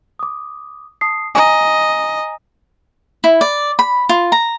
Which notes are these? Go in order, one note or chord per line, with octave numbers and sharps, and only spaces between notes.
D6 D#6
A5 D#6 C7
D#5 G#5 A#5
E4
D5
B5
F4
A#5